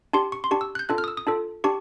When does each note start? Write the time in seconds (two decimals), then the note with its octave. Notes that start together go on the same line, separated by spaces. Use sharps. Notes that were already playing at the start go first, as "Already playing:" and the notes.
0.13 D4 G4 C6
0.32 C#6
0.44 C6
0.51 D4 G4 C#6
0.61 E6
0.75 F#6
0.79 G6
0.89 D4 F4 A4 F#6
0.98 F6
1.04 D#6
1.08 E6
1.17 D#6
1.27 D4 F4 A4
1.64 D4 G4 C#6